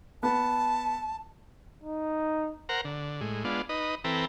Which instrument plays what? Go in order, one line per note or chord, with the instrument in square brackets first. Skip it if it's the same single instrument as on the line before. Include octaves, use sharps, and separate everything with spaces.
[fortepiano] B3 [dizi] A5
[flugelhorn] D#4
[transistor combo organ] A#4 C5 F#5 A#5
D3
A2 G#3
G#3 B3 D4 F4
D#4 B4 D#5
E3 C4 A4 B4 G5 A#5